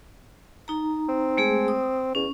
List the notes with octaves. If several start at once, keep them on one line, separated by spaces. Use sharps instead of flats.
D#4 A#5
C4
G#3 A3 G#4
D#6
E2 C#4